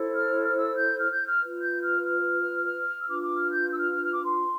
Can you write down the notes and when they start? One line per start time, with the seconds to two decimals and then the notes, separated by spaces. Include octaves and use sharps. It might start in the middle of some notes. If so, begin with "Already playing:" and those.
Already playing: E4 A4 C5
0.12 F6
0.43 F6
0.55 E6
0.76 G6
0.97 F6
1.11 G6
1.25 F6
1.39 F4 B4
1.60 G6
1.81 F6
2.03 F6
2.99 E6
3.07 D4 F4 B4 D6
3.22 D6
3.36 F6
3.49 G6
3.72 E6
3.77 F6
3.92 F6
4.02 F6
4.12 D6
4.23 C6